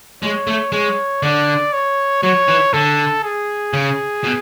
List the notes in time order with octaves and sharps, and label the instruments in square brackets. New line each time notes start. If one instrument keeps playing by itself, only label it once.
[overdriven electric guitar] G#3 [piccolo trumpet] C#5
[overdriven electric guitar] A3
[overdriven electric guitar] G#3 [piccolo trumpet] C#5
[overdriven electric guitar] D3 [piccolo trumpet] D5
[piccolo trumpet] C#5
[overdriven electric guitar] F#3 [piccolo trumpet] C#5
[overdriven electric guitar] E3
[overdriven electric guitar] D3 [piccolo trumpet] A4
[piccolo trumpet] G#4
[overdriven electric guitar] C#3
B2